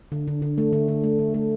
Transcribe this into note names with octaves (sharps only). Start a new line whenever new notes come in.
D3
D3
D3
A3
D3
D3
A3
D3
A3